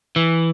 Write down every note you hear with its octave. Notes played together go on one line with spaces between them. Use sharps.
E3